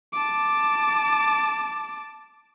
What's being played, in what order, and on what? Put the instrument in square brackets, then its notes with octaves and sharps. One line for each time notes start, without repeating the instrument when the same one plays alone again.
[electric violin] A5 D6